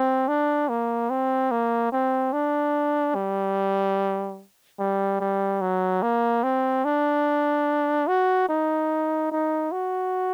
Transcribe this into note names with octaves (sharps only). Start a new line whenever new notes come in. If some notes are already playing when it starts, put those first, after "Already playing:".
Already playing: C4
D4
A#3
C4
A#3
C4
D4
G3
G3
G3
F#3
A#3
C4
D4
F#4
D#4
D#4
F#4